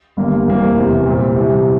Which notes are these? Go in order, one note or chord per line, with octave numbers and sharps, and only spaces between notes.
G1 G2 D3 G3 A#3
F1 F2 E3 A#3
F1 E2 C3 E3
A#2 G3 C4
C2 C3 E3